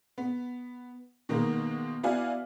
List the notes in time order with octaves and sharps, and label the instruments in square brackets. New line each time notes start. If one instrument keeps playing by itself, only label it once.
[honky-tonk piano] B3
B2 D#3 G#3 A#3
B3 E4 F#4 D5 F5 G#5